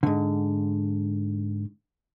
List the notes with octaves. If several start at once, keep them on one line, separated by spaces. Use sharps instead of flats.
G#2 D3